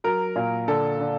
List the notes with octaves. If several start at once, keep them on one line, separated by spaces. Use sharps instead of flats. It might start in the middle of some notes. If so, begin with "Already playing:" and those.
F#3 A#4
A#2
D3 A4
D3